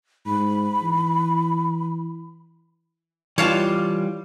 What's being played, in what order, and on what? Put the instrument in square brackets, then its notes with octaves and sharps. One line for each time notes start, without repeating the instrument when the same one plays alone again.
[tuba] G#2 [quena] B5
[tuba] E3
[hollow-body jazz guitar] E3 F4 [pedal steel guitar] G3 [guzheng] C#5 F5 A5